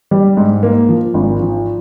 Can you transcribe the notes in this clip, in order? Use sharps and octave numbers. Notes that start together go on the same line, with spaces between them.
G3
G#2
A#3
F3
G#1
F3